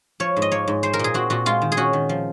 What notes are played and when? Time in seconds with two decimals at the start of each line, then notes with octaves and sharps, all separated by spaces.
0.20 F3 C#5
0.36 G#2
0.42 D#5
0.51 A#3 C#5
0.68 G#2
0.83 G#3 C5
0.93 A#4
0.99 A#2 G#4
1.14 C4 F#4
1.30 A#2 F#4
1.46 G#3 F4
1.62 D#3
1.72 G#4
1.77 C#4 F#4
1.93 D#3
2.09 F3